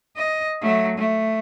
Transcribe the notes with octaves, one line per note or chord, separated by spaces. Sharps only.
D#5
F#3 A3
A3